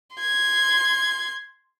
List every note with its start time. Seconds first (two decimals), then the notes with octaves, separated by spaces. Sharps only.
0.16 C6 G#6